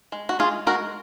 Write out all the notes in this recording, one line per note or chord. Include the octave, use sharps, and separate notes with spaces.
G#3
F#4
G#3 F4 G#4
G#3 F#4 A#4